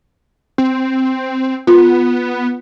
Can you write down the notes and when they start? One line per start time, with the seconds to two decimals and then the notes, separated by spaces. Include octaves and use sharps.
0.58 C4
1.67 B3 F4